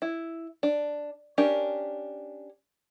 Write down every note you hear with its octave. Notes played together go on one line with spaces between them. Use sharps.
E4
D4
C#4 D4 G4 A#4